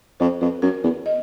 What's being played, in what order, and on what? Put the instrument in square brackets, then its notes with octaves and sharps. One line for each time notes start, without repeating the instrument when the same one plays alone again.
[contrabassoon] F2 [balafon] C5
[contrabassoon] F2 [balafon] B4
[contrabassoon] F#2 [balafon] A#4
[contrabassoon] E2 [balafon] B4
[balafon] D#5